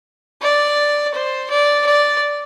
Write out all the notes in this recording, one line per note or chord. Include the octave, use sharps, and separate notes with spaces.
D5
C5
D5
D5